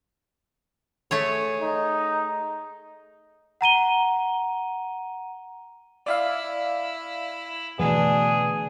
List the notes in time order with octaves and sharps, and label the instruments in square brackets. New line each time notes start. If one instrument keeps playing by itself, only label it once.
[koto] A3 G#4 C#5
[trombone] D#4
[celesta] F#5 A#5 D#7 G7
[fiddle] E4 [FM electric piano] D5 E5 F5
[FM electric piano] B2 B3 [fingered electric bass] D3 E3 A3 [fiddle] D4 [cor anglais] G#4